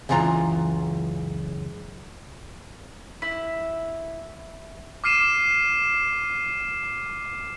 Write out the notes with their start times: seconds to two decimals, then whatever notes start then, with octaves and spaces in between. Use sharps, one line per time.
0.09 C#2 F#2 E3 F4 A#5
3.22 E4
5.04 D6 F6 C7 D#7 E7